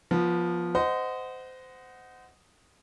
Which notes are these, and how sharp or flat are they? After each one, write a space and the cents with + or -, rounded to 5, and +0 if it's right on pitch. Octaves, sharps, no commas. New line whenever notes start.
F3 +0 B3 -25
C5 -25 D#5 +0 F#5 +0